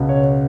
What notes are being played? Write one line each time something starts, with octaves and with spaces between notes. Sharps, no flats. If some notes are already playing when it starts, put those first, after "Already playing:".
Already playing: C#2 B2 B3
C#5